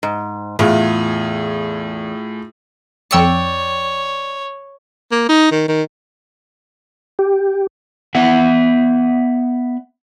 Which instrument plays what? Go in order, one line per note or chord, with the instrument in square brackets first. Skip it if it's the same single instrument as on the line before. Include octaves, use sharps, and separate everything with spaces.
[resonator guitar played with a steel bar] G#2
[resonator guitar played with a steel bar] E2 [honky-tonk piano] A2 F4 G#4
[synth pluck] F2 E6 C#7 [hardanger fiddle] C#5 [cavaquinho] D5 G5
[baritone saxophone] A#3
D#4
D#3
D#3
[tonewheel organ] G4
[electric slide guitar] B3 D5 E5 F#5